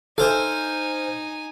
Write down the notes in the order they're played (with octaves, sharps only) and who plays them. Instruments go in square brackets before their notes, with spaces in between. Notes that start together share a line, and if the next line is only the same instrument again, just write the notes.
[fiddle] D#4 G#5 [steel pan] A4 [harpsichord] C5 F5